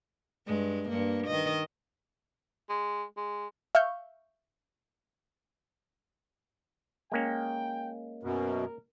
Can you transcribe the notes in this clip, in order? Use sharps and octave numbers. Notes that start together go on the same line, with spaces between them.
G2 G#3
G2 A#3
D#3 D#5
G#3
G#3
E5 F5 C#6 F6 G6
G#3 A#3 C#4 G5
F#2 B2 A#4